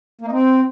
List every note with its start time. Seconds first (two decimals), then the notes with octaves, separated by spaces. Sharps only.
0.21 A#3
0.26 D#4
0.31 C4